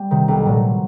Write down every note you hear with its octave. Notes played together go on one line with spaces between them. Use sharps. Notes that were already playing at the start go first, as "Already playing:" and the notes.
Already playing: G3
C3 D#3
B1
A#2 F#3 A3